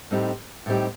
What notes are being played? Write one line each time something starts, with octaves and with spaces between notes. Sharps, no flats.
A2 G3 C4 D#4 G4
A2 G3 C4 D#4 G4